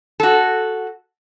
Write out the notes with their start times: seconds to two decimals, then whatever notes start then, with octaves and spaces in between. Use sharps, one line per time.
0.20 F#4 A4